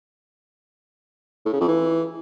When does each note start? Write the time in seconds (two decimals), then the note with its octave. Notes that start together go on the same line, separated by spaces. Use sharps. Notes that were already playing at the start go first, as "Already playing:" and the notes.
1.46 A2
1.53 C#3
1.61 F2
1.68 E3